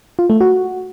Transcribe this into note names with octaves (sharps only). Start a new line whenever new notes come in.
F4
A3
F#4